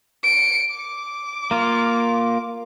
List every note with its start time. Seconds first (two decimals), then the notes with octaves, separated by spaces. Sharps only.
0.23 C#7 D7
0.73 D6
1.51 A#3 F4